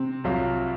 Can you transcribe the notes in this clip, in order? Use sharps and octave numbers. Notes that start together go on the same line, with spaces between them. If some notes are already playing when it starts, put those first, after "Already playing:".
Already playing: C3 C4
C2 C3 F#3 C4 F4